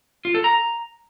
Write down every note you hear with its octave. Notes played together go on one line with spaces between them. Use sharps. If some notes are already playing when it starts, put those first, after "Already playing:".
F4
A4
A#5